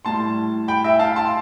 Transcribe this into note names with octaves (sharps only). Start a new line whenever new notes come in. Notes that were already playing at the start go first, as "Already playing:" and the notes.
A2 G3 A5 C6
G5 B5
E5 G5
F5 A5
A5 C6